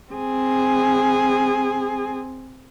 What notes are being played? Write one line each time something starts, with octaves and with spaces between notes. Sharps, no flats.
C4 G#4